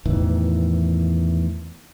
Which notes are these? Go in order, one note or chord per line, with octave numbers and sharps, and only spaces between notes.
E2 A2 D#3 E3